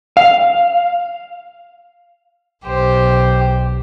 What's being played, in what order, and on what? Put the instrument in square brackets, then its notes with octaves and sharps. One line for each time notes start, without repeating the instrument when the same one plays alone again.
[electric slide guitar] F5
[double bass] B1 [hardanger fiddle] G4 C5